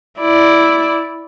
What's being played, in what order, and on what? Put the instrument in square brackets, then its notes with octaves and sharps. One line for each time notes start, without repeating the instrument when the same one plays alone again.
[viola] E4 D5